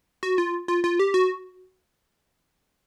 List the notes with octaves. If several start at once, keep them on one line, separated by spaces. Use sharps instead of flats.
F#4
F4
F4
F4
G4
F#4